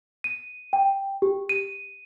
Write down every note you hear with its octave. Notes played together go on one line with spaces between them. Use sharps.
D#7
G5
G4
D#7